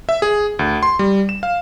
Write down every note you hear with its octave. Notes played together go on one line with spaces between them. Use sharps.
E5
G#4
D2
C6
G3
E7
F5